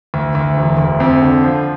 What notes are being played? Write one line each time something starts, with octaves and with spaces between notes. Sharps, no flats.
D2
D2
E1
D2
F2
D3
F3